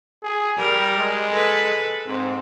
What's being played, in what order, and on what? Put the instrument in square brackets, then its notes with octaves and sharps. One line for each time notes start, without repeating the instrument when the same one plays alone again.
[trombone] G#4
[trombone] G3 [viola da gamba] A#4
[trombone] G#3
[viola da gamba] A4 B4
[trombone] G#2 [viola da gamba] C4